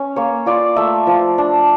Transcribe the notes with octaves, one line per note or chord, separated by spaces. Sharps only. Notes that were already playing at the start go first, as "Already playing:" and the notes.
Already playing: C#4
A#3 C#5
F4 D5
A3 E5
F3
D4